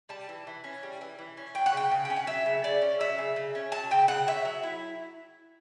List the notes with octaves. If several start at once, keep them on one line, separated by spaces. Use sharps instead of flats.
G3 A5
E3
E3
C#4
G3
E3
E3
C#4
F#3 G5
F#5
C#3 G5
C#3
G5
C#4
F#5
F#3 E5
C#3
C#3 D5
C#4
F#3 E5
C#3
C#3
C#4
F#3 A5
C#3 G5
C#3 F#5
C#4 E5
F#3
E4